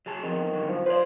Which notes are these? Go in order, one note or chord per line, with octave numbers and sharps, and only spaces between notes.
F#3 G#4 A5
D#3 F3 B3 C4
G2 D3 F#3
F3
F3 B4 C5 D5